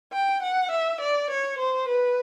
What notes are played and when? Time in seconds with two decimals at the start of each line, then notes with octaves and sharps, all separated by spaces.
0.13 G5
0.42 F#5
0.71 E5
1.00 D5
1.30 C#5
1.58 C5
1.88 B4